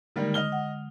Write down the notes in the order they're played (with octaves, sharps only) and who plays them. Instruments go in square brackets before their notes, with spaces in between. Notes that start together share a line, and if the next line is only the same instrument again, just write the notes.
[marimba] D3 G#3 [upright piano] D#3 G3 A#3
[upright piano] D#5 F6 G7
[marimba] F#5